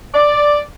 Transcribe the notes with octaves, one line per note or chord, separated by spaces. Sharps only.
D5